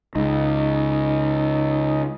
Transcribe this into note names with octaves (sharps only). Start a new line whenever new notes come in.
C#2 D#4